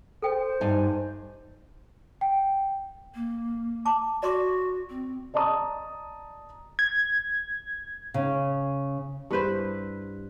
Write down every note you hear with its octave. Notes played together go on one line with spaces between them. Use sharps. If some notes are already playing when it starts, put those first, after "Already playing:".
A4 C5 G5
G2 D#4 G#5
G5
A#3
A5 A#5 D6
F#4 D5 C6 D6
C4
D5 D#5 A5 A#5 D#6
G#6
C#3
G2 E4 B4 C5